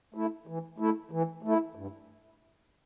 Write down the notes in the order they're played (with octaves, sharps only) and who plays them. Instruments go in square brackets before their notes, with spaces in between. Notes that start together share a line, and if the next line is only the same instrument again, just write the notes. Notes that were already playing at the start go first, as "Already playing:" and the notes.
[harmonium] A3 E4
E3
A3 E4
E3
A3
E4
G2